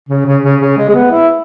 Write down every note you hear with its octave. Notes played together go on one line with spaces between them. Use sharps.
C#3
C#3
C#3
C#3
G#3
G#3
B3
E4